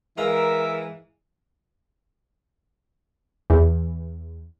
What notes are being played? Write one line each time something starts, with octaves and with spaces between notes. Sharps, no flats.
E3 G#3 A#4 E5 F5 A#5
E2